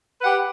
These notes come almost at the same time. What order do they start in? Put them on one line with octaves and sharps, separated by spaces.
B4 F#5 G4